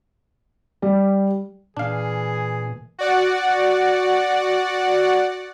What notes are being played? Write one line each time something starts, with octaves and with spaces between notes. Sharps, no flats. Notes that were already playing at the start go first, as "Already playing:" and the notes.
G3
A#2 E3 D4 G#4 F5
F#4 D5 F#5